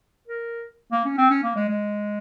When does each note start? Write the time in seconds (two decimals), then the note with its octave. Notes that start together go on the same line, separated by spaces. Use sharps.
0.28 A#4
0.92 A#3
1.05 C#4
1.18 C4
1.30 C#4
1.43 A#3
1.56 G#3
1.69 G#3